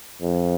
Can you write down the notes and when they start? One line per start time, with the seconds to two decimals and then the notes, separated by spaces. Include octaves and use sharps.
0.21 F2